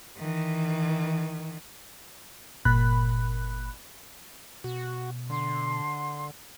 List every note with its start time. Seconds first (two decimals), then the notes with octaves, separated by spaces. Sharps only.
0.17 D#3 E3
2.65 G1 A#2 B5 F#6
4.64 B2 F#4
5.30 D3 C6